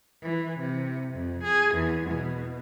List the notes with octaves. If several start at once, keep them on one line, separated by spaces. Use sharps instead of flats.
E3
C3
F2
G#4
E2
B2